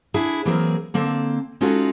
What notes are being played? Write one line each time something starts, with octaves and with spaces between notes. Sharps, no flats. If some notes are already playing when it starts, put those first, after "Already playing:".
D4 E4 G#4
E3 F#3 A#3 C4 G#4 A#4
D3 A#3 C4 A4
G#3 C#4 D#4 F4 F#4 A4